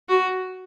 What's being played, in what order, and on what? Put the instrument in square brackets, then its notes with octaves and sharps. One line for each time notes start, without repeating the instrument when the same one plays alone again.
[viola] F#4